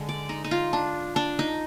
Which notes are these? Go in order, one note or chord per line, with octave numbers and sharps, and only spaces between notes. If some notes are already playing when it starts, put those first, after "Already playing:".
Already playing: D3 G#3
D5
D#4
D#4
F4
D4
D4
D#4